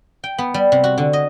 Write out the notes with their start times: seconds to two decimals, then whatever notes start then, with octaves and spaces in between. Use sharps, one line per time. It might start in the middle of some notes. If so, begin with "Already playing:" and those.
0.24 G5
0.38 B3
0.54 G3
0.72 C3
0.84 F#4
0.98 D3
1.13 D#5